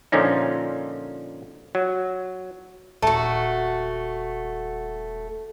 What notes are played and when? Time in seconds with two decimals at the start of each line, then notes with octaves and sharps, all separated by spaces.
0.12 A#2 D3 F3 C#4 D#4
1.75 F#3
3.02 D#1 A3 F#4 A5 A#5